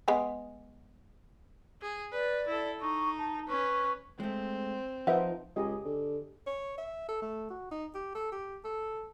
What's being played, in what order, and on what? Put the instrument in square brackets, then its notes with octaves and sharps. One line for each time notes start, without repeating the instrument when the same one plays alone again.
[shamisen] G#3 B3 G#4
[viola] G#4
[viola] B4 [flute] D5
[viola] E4 A4
[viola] D#4 [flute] C#6
[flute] A5
[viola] C#4 B4 [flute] C#6
[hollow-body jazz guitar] G#3 A3 [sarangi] C4
[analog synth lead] F3 [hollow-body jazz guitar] D#4 A#4 [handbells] B4 E5 F#5
[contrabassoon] C#2 [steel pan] G4 G#4 D#5
[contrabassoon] D3
[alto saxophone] C#5
E5
A4
A3
F#4
D#4
G4
A4
G4
A4